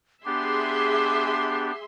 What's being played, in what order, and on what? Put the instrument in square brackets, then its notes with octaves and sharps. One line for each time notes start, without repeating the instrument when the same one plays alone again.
[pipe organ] B3 D4 G4 [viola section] G#4 E5 C6 [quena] D6